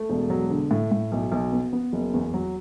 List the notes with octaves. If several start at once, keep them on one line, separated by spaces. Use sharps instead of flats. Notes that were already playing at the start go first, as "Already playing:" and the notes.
Already playing: A3
E1
F#3
D3
A2
A2
B1
B1
B3
B3
F#1
E2
F#3